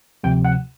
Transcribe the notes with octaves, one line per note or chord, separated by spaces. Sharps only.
D2 C3 F3 G5
F#5